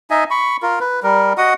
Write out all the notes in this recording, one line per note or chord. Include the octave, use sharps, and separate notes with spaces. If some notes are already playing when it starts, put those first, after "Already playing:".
D#4 D#5 E5 G#5
B5 C#6
F4 A#4
B4
G3 A#4
F#4 D#5 F#5 D#6